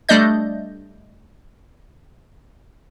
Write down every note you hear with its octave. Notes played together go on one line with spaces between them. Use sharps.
G3 A3 D4 D5 D#5 G6